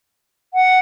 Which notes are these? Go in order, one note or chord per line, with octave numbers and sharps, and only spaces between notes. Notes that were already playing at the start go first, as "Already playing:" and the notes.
F#5